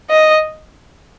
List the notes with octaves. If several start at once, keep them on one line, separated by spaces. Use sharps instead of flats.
D#5